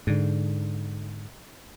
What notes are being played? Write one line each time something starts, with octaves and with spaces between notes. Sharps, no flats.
G#2 D3